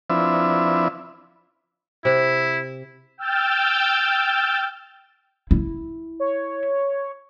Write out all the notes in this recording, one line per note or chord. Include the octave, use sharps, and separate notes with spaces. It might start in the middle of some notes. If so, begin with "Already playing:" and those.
F3 C4 D4 E4 B4 E5
C3 E4
G5 E6 F6 G6 A6
E4
C#5